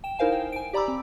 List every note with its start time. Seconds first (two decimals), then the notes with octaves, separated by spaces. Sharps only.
0.04 G5 E7
0.19 D#4 E4 A#4 C5 F5 G#5
0.32 G5
0.52 G#5 D7
0.73 G4 D5 A#5 B5 D6 E6
0.88 C4